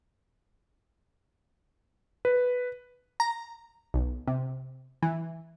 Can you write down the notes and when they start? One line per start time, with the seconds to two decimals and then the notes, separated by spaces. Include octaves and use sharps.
2.25 B4
3.20 A#5
3.94 B1
4.27 C3
5.02 E3